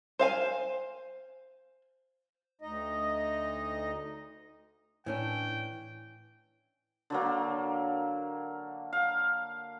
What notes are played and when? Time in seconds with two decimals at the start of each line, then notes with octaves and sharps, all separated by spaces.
0.19 C5 F5 G#5
2.61 D2 D#4 D#5
5.06 A2 E3 C#4 D4 G5
7.10 D3 F#3 A#3
8.93 F5